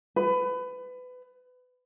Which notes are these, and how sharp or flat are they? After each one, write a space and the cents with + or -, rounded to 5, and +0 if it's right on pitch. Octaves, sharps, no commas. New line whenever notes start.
B4 +25